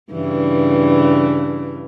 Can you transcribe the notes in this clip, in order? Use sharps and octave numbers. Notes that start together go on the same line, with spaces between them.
G2 C#3 E3